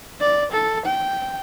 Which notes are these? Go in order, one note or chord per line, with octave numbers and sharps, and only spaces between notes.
D5
A4
G5